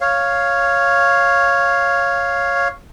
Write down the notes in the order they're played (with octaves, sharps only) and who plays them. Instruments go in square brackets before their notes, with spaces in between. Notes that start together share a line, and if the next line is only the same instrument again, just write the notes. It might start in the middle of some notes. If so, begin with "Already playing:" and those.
[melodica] C#5 F5